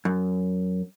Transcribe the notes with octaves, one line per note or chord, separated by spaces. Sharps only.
F#2